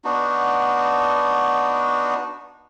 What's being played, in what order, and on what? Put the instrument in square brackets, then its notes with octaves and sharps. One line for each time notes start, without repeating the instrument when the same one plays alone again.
[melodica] B3 D4 D#4 F#4